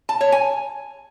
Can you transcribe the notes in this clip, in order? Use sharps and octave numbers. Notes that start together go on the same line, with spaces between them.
A5
C#5
G#5